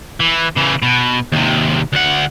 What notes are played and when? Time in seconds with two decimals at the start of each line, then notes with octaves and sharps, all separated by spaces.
0.20 E3
0.57 C#3 E3
0.82 B2
1.32 D#2 C3
1.93 D2 F#5